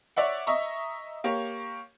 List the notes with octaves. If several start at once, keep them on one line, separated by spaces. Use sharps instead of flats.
C#5 D5 E5 F#5
D#5 E5 A#5 C#6
A#3 G4 C#5